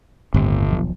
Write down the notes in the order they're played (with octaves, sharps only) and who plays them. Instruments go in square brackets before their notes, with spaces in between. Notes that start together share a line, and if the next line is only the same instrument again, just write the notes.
[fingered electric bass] G1 [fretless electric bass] D#2 A2 C4
[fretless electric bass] D#1 B1 F3